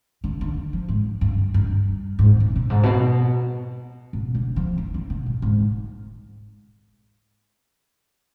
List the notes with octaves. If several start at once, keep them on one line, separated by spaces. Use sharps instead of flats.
D3
D3
F3
G#2
G2
G2
G#2
B2
G2
G#2
B2
B2
D3
F3
D#3
D3
B2
G2
G#2